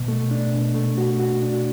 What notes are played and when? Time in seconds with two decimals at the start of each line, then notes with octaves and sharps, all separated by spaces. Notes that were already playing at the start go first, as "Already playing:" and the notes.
Already playing: B2
0.08 A3
0.31 D4
0.53 B2
0.74 A3
0.98 F#4
1.19 F#4
1.42 D4